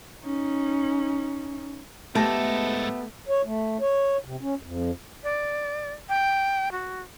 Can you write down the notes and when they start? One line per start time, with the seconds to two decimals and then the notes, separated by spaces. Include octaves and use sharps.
0.22 C#4 D#4
2.15 G#2 A3 B3 G4 A4 A5 A#6
3.29 C#5
3.45 A3
3.81 C#5
4.24 C3
4.41 C#4
4.63 F2
5.24 D5
6.09 G5
6.72 F#4